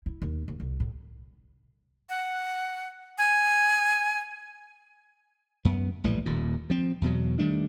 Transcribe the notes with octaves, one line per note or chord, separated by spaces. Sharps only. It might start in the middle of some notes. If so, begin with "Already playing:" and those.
E4
D#2
D#2
C2
A2
F#5
G#5
F#2 B3
A#1 A2 E3 G3
D#1 D#2 A#2
F3 C4
E2 B2 F#3
D#3 G3 A3 D4